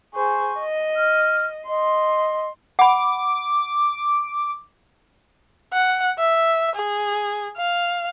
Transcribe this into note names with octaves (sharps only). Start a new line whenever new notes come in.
G#4 C5 C#6
D#5
F6
D#5 C6
F#5 B5 D6
F#5
E5
G#4
F5